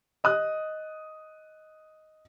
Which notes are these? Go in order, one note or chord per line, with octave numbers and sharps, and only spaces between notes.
D#5 D#6 F#6